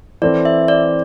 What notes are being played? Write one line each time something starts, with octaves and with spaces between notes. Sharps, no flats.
E3 C4 A4 D5
E5
D5